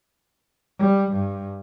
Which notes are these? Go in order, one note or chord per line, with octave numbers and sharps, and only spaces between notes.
G3
G2